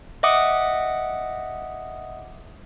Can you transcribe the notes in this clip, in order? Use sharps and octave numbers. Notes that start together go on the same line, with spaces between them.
D#5 E5 F#5 D6 D#6 C#7